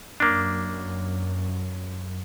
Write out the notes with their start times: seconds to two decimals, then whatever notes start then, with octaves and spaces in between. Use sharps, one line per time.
0.20 F#2 A#3 D4